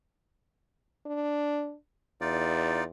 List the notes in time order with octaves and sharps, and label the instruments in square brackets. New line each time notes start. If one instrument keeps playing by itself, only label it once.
[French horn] D4
[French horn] E2 [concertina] D#4 F4 D5